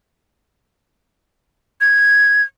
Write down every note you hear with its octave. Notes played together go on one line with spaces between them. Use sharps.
G#6